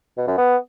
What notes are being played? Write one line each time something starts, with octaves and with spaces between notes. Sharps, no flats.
B2
F#2
B3